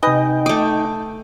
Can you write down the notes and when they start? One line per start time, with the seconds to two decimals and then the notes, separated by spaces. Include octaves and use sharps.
0.03 C3 D#4 B4 D#5 G5 G#5
0.46 A3 D6 D#6